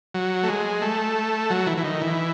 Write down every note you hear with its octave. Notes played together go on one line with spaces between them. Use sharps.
F#3
A3
G#3
A3
F#3
E3
E3
D#3
E3